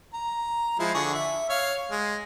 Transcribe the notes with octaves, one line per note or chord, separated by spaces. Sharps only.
A#5
F3 G#3 E4
D3 G#4 C#6
E5
C#5 F5
G#3